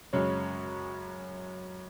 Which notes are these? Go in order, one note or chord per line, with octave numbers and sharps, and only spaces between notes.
F#2 C#3 G#3 C#4 C#5